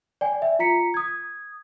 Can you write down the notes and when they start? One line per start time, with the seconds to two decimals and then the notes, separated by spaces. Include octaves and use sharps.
0.21 D5 G5 G#5
0.42 E5
0.59 F4 A#5 B6 C#7
0.94 D#6 G#6